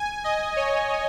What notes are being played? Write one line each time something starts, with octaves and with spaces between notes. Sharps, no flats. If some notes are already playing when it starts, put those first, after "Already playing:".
Already playing: G#5
D#5
C#5